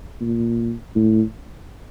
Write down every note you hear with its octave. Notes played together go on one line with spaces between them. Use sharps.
A#2
A2